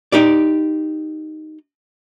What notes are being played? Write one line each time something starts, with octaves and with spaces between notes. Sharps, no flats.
D#4 G4 D5